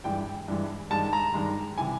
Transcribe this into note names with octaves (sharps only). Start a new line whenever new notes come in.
G2 E3 G#3 G5
G2 E3 G#3
G2 D#3 G#3 A5
A#5
G2 D#3 G#3
C3 E3 G3 G#5